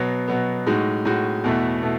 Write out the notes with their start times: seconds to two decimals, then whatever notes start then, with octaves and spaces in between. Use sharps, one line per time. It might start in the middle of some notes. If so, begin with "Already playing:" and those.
Already playing: B2 F#3 B3
0.28 B2 F#3 B3
0.66 A2 G#3 D#4 F#4
1.05 A2 G#3 D#4 F#4
1.44 E2 B2 A3 E4
1.83 B2 A3 E4